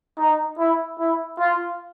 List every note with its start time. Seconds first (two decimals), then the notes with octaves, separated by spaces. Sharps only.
0.18 D#4
0.58 E4
0.99 E4
1.39 F4